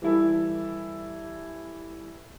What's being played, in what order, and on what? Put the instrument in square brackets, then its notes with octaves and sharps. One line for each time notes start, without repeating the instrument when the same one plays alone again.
[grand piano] E3 G3 E4 A4